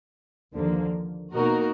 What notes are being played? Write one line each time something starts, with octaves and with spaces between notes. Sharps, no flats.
D#2 D3 F3 A#3
B2 A#3 D#4 F#4 A#4